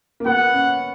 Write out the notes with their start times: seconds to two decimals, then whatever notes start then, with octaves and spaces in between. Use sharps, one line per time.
0.20 A#3
0.26 B3 F#5
0.54 C#4